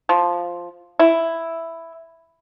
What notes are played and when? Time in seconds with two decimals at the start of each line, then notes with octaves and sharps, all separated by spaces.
0.09 F3
0.99 E4